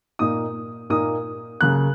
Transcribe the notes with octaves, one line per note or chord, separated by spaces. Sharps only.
A#2 A#3 D#4 D#6
A#2 A#3 D#4 D#6
C#3 F#3 A#3 F#6